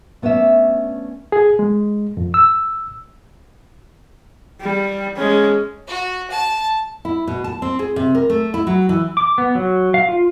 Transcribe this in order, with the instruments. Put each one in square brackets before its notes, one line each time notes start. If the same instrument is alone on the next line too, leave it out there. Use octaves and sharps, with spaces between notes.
[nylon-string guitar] A3 B3 C#4 D4 E5
[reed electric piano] G#4
G#3
F2
E6
[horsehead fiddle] G3
G#3 C#4
[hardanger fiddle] F#4
A5
[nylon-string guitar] E4
B2
A5
C4
G#4
C3
A#4
A3
E4
F#3
E3
[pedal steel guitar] D6
B3
F#3
F5
F4